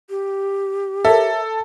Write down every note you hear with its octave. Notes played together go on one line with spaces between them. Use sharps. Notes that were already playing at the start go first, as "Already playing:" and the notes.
G4
A4 A#4 C#5 E5